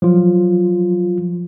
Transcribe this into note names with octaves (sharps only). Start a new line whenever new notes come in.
F3 F#3 F4